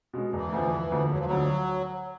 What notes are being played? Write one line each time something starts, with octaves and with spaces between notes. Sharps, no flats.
B2 G#3 C#4
E1 E3
D2 D3 F3
E1
D2 D3 F3
E1 F#3
F3
F#3
D2 D3 F3